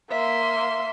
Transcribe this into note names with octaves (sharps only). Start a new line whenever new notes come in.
A#3 E5 C6